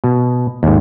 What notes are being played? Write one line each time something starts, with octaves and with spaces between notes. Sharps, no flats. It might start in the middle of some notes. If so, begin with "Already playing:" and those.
B2
D#2 G#2